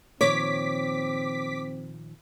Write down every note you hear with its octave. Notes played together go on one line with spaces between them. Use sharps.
A#2 D#3 F3 C4 C#5 D6 B6